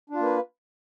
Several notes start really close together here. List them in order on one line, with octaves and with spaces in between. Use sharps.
D4 F4 A#3 B4